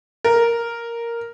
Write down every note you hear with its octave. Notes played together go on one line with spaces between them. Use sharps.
A#4